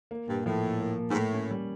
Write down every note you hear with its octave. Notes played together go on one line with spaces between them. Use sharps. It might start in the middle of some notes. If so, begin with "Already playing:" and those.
A#3
G2 A#2
A2 F3
A#2
A#3
A#2
G#2
A2 A#3
C#4
G3